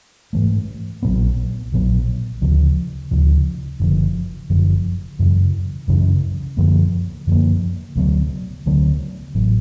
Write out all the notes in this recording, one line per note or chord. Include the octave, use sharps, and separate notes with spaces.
G#2 E3 A3
A#1 A#2 F#3 B3
A#1 A#2 F#3 B3
D2 C#3 F3
D2 C#3 F3
F#1 F#2 D3 F3
F#1 F#2 D3 F3
F#2 C#3 E3
F#2 C#3 E3
F#2 D3 F3 A#3
F#2 D3 F3 A#3
D2 D3 F#3 B3
D2 D3 F#3 B3
A1 A2 F#3